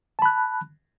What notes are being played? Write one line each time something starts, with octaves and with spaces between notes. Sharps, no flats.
A5 B5 F#6